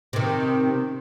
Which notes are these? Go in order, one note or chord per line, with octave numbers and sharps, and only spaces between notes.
C3 D#3